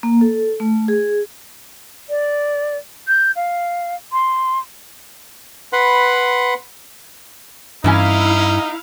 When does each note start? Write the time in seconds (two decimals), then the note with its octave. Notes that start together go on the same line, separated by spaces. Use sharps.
0.03 A#3
0.21 A4
0.60 A3
0.88 G#4
2.09 D5
3.08 G6
3.36 F5
4.12 C6
5.73 B4 F#5 B5 C6
7.84 G2 E3 C#4 D#4 E4 F5 G#5